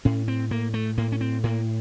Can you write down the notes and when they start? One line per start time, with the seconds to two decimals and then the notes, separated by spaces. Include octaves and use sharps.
0.05 A2 C#4
0.28 C4
0.51 A2 A#3
0.74 A3
0.97 A2 A#3
1.12 C#4
1.21 C4
1.43 A2 A#3